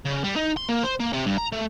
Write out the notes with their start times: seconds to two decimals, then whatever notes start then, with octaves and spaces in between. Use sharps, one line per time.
0.05 C#3
0.24 G3
0.36 D#4
0.57 C6
0.69 A#3
0.84 C5
1.00 A#3
1.13 C3
1.26 G2
1.38 A#5
1.52 A3